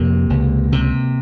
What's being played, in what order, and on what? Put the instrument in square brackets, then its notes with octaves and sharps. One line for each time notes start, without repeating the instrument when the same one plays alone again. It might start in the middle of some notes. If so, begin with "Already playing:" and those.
Already playing: [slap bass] F2 C3 A#3
C#2
C3